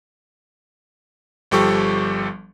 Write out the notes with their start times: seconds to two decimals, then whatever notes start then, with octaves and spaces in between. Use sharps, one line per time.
1.51 G1 F3 G3 G4 A4 C#6